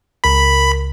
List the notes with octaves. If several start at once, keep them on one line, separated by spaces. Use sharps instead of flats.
C#2 A#4 B5 B6